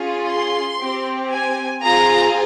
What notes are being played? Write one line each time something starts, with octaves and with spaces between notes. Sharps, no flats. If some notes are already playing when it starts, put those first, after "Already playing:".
Already playing: C#4 F4 G#4
C6
C4 G4
G#5
C4 F4 G#4 A#5